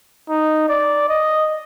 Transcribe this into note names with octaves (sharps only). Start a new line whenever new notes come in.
D#4
D5
D#5